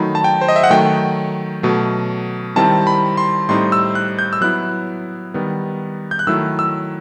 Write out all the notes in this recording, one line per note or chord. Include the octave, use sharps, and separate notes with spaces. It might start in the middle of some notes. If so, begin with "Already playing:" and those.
Already playing: D#3 F#3 A3 D#4 B5
A5
G5
C5
D#5
E5
F#5
D#3 F#3 A3 G5
B2 F#3 A3
D#3 G3 C4 E4 A5
B5
C6
A2 G3 C4 D#4 C6
E6
F#6
G6
E6
F#3 B3 E4 F#6
D#3 G3 B3
G6
F#6
D#3 F#3 A3 E4 E6
E6